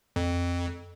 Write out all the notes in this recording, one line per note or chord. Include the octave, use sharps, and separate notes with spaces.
F2